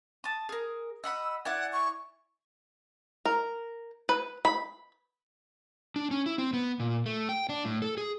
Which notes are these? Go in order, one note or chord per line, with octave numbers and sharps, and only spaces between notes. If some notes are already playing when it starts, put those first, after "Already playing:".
A5 D#6
G#4 A#4
D#5 F#5 B5 E6
E4 D5 F#5 G#5
C#6
A#4
B4
B5
D4
C#4
E4
C4
B3
A#2
A3
G5
D4
A2
A4
G#4